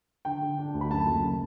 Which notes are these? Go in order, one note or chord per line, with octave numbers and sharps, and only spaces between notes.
D3 G5
D3
D4
D2
B5
F#2 A5
F#1
C#3